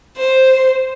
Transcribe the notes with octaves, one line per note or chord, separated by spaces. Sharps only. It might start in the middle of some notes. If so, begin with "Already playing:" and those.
C5